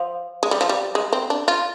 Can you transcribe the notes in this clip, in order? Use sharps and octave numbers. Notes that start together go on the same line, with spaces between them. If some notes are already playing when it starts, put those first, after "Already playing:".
Already playing: F3
G#3
G3
F3
G3
G#3
C4
D4
F4